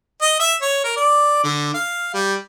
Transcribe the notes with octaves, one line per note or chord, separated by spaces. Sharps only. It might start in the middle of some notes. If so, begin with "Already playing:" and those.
D#5
E5
C#5
A#4
D5
D3
F5
G3